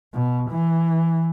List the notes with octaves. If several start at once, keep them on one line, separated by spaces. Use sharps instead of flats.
B2
E3